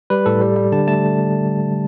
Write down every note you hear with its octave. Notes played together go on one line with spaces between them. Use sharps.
G3 B4
A2 A4
G3
G3
D3 A5
A3 A5